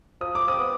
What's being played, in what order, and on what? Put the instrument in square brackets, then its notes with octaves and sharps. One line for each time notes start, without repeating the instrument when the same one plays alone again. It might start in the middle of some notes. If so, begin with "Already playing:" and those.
[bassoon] F3 [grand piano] D#6
[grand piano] D6
[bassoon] C4 [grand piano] D#6
[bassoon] B3